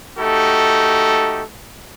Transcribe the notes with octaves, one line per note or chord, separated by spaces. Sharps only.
A3 D#4 F#4 G4 A4